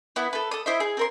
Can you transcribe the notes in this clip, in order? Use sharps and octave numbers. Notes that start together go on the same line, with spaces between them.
B3 E4
A4 B4
A4 D#6
E4 C5 D#5 E5
G#4
C4 A#4 C6